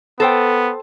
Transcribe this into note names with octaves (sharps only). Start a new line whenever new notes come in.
B3 A4 C5 G5